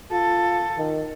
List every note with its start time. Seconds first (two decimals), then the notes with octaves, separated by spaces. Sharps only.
0.11 F4 A4
0.78 D#3